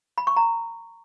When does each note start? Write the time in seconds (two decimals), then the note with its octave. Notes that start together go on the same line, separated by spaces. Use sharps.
0.18 B5
0.27 C#6
0.36 A#5